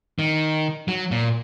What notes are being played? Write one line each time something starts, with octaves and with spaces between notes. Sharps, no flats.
D#3
F#3
A#2